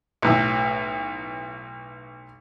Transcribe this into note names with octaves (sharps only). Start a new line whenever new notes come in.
B1 A2